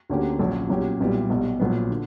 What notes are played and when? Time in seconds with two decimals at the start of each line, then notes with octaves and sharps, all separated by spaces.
0.09 D2 D3 A#3 C#4 G4
0.39 A#1 A#2 F#3 C#4
0.69 B1 A#2 F#3 C#4 G4
1.00 B1 A#2 G3 B3 E4
1.30 B1 B2 G3
1.59 A#1 A#2 F#3 B3
1.90 D3